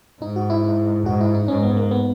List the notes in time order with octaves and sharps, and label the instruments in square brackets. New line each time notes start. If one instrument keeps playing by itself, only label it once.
[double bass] G#2 [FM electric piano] D#4
[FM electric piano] F#4
E4
E4
[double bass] G#2 [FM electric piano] F#4
[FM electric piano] E4
D#4
[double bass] G#2 [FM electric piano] C#4
[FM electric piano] B3
A#3
B3